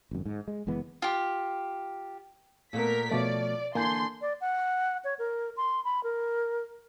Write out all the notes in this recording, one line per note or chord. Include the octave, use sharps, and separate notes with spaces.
G#1 F#2
G#2
G#3
F#1 E3 G#3 B3
F4 G4
A#2 A3 B3 A#4 B6
B2 F3 A3 C#5 D5
D3 E3 A#3 G#5 C6 G6
D5
F#5
C#5
A#4
C6
B5
A#4